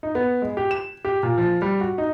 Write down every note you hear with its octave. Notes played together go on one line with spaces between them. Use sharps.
D#4
B3
G#3
G4
E7
G4
A#2
F3
G3
F#4
D#4